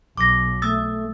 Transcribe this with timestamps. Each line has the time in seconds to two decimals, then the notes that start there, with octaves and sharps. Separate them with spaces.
0.17 B1 D6 A#6
0.62 A3 D#6 E6 A6